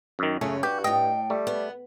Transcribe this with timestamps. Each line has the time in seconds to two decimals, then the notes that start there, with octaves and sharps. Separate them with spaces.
0.19 F#2 D#3
0.41 F#2 C#3 A3 C#4 G#4
0.63 G2 F#4 G4
0.84 A2 D#5 G5
1.30 G3 A3
1.47 B3